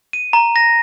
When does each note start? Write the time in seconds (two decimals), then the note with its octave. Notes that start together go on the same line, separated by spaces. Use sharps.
0.13 D#7
0.33 A#5
0.56 A#6